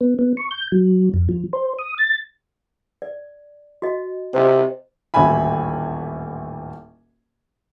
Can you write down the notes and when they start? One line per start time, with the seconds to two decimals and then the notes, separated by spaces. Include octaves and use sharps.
0.01 B3
0.19 B3
0.37 C#6
0.51 G6
0.72 F#3
1.14 F2
1.29 F3
1.53 C5
1.79 D#6
1.98 A6
3.02 D5
3.82 F#4 D#5
4.34 C3 C5 D#5
5.14 D#1 A1 D2 E5 G#5 B5